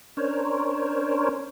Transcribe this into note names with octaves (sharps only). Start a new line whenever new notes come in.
C#4 D4 A#4 C5 C#5